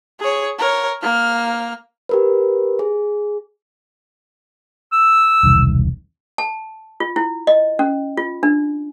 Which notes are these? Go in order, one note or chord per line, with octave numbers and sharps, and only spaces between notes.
G#4 C#5
A#4 C#5
A#3 F6
G4 A#4 B4
G#4
E6
E1 C2 D#3
A5
F4
E4
D#5
C#4
F4
D4